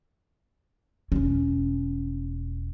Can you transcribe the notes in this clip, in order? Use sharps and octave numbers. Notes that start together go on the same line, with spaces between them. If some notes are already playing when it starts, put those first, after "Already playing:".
E1 C#4